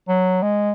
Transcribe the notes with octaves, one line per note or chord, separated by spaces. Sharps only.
F#3
G#3